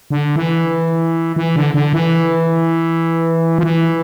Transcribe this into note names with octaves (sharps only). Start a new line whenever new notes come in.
D3
E3
E3
D3
D3
E3
F3
E3